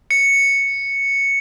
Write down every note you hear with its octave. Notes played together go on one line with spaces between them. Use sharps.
C#7